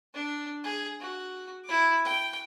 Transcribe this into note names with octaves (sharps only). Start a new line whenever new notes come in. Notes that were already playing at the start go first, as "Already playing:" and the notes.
D4
G#4
F#4
E4 D6
G5